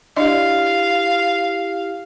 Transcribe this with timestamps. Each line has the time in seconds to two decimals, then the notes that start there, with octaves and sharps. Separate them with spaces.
0.17 D4 E4 G4 D5 D#5 F5